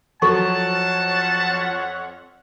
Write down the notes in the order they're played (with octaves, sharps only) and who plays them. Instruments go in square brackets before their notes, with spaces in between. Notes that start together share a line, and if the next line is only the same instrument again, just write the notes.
[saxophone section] F2 C#5 F#5 [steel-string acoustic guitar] F3 F#3 [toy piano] A4 C#6 [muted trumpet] A5